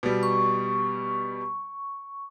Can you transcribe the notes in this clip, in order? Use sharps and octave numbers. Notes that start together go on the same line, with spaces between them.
B2 G3
C#6